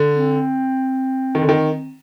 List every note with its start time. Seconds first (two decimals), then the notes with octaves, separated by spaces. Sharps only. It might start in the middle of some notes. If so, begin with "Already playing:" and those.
Already playing: D3
0.16 C4
1.35 D#3
1.42 D3
1.49 D#3